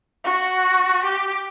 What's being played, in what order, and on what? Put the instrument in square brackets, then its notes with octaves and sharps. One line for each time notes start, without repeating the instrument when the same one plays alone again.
[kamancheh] F#4
G4